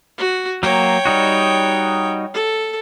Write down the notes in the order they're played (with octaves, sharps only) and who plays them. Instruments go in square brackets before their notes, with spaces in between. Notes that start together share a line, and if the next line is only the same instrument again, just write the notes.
[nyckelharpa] F#4
[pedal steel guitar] F#3 A#3 [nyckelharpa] C#5 G5
[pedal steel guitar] G3 D#4 F#4
[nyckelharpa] A4